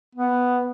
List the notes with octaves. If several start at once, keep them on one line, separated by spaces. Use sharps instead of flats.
B3